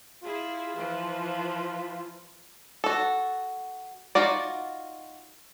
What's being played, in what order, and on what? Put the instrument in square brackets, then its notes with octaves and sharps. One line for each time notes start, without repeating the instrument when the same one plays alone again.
[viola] E4 G#4 [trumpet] F4
[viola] E3 F3
[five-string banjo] F#4 A4
D#4 F4 F#4 D5